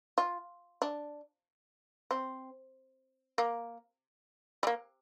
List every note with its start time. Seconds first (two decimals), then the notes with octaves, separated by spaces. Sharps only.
0.18 F4
0.82 D4
2.11 C4
3.38 A#3
4.63 G3
4.67 A#3